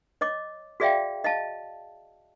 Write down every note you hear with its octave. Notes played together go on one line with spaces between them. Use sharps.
C#5 D#5 D6
F#4 G#4 D5 E5 F5 G5
D#5 F5 A5